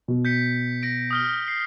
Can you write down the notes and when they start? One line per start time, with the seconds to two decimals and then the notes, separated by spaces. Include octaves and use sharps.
0.08 B2
0.25 G6 B6 C#7
0.83 A#6 D7
1.11 D#6 F6 G7
1.48 C7